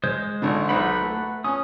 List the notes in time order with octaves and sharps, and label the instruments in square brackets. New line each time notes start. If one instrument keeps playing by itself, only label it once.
[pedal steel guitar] G#3 C5
[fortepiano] G#1 D3
[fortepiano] B1 C5 [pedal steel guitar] B4 F#5 B5
[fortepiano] A3
[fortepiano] C#4 [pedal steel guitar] D#6